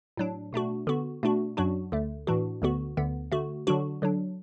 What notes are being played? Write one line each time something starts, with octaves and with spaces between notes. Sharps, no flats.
A2 F#3 D4
B2 A3 D4 F#4
D3 B3 F#4
B2 A3 D4 F#4
F#2 F#3 D4 F#4
D2 D3 A3
A2 E3 D4 F#4
D2 D3 B3 F#4
D2 D3 B3
D3 A3 F#4
D3 F#3 D4 F#4
D3 F#3 D4